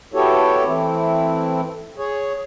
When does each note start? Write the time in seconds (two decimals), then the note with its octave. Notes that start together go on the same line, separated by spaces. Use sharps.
0.14 B3 E4 F#4 G4 A4 C#5
0.65 E3 A3 C4 E4
1.97 G#4 C#5